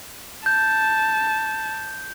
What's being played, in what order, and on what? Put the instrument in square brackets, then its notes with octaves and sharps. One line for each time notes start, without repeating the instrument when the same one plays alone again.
[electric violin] A5 [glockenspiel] G6